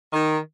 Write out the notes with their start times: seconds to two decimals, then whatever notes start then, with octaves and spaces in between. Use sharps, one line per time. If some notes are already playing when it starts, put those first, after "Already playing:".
0.13 D#3